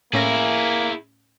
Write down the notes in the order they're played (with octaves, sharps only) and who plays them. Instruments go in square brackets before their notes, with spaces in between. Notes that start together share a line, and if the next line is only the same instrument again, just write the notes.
[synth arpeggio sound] A2 C#4 A#6 [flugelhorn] A#3 [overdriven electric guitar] E4 G#4